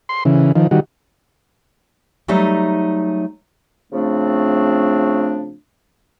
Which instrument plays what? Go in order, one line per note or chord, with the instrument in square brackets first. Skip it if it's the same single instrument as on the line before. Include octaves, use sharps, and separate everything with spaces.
[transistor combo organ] C6
C#3 E3
D#3 F3
D#3 G3 F#4
[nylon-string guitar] F#3 G3 A3 D#4
[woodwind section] C#3 F3 A3 C4 D4